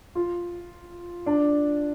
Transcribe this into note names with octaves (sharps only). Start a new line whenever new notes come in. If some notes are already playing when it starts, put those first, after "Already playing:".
F4
D4